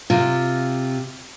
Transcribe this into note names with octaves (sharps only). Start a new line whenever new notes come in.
C3 F4